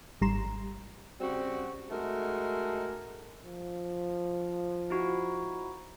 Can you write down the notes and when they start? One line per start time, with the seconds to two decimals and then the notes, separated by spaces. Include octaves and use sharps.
0.21 G#1 G3 A#5 C6 E7
1.20 C#3 G3 C4 F#4
1.90 G#3 A3 D#4 F#4 A#4
3.45 F3
4.90 D#4 E4 F#4